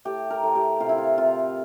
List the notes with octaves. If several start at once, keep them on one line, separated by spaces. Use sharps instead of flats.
A2 G4
A#4
A2
G4
C3 F4
E4
F4
C3 F4